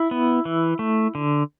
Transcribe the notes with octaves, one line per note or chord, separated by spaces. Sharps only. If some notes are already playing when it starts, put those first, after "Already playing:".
Already playing: E4
B3
E3
A3
D3